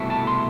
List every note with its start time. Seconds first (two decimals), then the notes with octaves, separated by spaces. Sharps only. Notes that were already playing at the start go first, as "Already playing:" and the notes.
Already playing: C2 B2 A3 E4
0.10 A5
0.27 C6